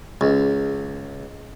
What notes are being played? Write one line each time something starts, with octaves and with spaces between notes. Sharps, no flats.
C#2